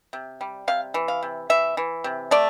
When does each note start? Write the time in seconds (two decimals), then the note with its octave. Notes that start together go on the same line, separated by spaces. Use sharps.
0.13 C3
0.41 G3
0.68 C3 F5
0.94 E3
1.08 F5
1.23 C3
1.50 E3 E5
1.77 E3
2.04 C3
2.31 A3 D5